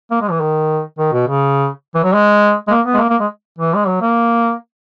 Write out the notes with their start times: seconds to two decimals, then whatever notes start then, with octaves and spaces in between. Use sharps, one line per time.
0.11 A#3
0.21 G#3
0.31 E3
0.41 D#3
0.98 D#3
1.12 B2
1.27 C#3
1.95 E3
2.04 F#3
2.14 G#3
2.68 G#3
2.70 A#3
2.86 B3
2.94 G#3
2.99 A#3
3.10 A#3
3.20 G#3
3.58 E3
3.75 G#3
3.87 F#3
4.01 A#3